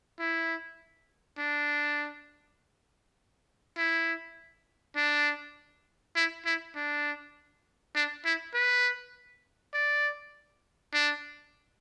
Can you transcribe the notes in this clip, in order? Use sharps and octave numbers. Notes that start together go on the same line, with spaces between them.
E4
D4
E4
D4
E4
E4
D4
D4
E4
B4
D5
D4